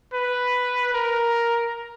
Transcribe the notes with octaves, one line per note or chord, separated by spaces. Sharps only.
B4
A#4